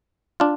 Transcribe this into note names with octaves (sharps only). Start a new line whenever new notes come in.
D4 F4